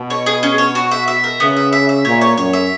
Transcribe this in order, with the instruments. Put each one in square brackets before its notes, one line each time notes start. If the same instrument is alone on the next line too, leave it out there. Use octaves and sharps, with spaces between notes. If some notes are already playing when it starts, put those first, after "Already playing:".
Already playing: [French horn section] B2
[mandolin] C#5
G#4
C#4
C#5
F#4
E5
E5
A#4
[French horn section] C#3 [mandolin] B3
[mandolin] E5
E5
E5
[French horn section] A#2 [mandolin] C#5
[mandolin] C#5
[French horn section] F#2 [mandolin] C#5
[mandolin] E5